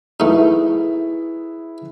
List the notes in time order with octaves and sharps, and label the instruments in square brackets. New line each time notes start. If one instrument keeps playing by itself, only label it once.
[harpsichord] A3 D#4 [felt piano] E4 G#4 B4